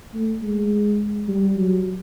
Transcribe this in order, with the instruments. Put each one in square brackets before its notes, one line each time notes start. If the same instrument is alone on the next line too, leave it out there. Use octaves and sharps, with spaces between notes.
[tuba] A3
G#3
G3
F#3